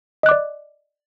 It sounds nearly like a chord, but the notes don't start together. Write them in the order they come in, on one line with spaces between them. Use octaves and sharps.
D#5 F#6 D6 D5